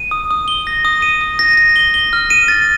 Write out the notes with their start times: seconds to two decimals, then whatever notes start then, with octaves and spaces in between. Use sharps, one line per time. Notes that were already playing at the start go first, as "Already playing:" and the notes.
Already playing: D#7
0.11 D#6
0.31 D#6
0.48 G7
0.67 A#6
0.85 D#6
1.02 D#7
1.21 D#6
1.39 A#6
1.57 A#6
1.76 G7
1.94 G7
2.13 F6
2.30 D#7
2.48 A6